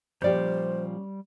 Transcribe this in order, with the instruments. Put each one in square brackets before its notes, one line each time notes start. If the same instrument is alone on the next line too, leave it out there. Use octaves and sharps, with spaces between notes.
[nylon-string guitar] A#2 F3 G4 [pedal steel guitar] G3 G6 [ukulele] C#4 D5 [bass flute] C5